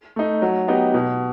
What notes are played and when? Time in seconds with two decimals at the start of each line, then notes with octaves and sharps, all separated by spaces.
0.16 A3 D#4
0.42 F#3
0.68 B3 D#4 G4
0.94 B2